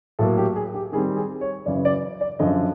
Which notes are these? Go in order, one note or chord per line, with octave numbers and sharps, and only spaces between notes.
A2 F#3 A#3 A4
G4
G#4
G4
D#3 G3 C4 G#4
G#4
C#5
F#2 C#3 E3 D5
D5
D5
F#2 D3 F3 D#5